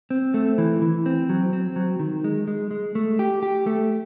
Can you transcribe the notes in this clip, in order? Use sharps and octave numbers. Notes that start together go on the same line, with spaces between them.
C4
A3
E3
E3
C4
F#3
C4
F#3
D#3
G#3
G#3
G#3
A3
G4
G4
A3